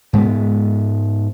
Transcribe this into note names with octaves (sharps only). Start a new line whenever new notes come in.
G#2 G#3 B3